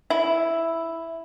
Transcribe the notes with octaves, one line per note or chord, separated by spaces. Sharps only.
E4